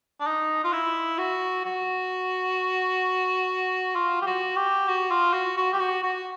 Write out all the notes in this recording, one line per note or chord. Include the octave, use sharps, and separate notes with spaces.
D4
D#4
F4
E4
F#4
F#4
F4
G4
F#4
G4
F#4
F4
F#4
F#4
G4
F#4
F#4